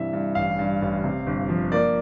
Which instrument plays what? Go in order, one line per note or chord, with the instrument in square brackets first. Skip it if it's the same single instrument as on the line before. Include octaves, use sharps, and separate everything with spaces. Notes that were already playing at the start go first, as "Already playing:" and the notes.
Already playing: [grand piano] G2 C3 E3 E5
G2
A1 F5
G2
A1
C3
G1
F3
A#3 D5